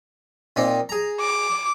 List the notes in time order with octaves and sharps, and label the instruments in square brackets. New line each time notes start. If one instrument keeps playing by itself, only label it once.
[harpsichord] A#2 C4 D#4
G#4 A#5
[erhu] D6